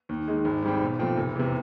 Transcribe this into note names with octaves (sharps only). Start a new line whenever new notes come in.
D#2
D#3 G#3
G#1
G#2 D#3 G3 C4
B1
A#2 F3 A3 C4
F1
E2 C3